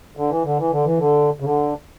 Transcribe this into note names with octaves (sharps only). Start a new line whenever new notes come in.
D3
E3
D3
E3
D3
E3
D3
C#3
D3